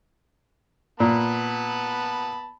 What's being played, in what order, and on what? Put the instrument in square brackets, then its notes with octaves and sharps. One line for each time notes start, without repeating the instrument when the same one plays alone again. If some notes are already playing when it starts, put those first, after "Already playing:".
[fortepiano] A#2 [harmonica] B3 A5 B5